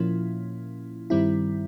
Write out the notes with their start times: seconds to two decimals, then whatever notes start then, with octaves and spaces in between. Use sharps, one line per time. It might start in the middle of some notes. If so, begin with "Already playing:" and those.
Already playing: A#2 F3 A#3 C#4 E4
1.10 G2 D#3 G3 C4 E4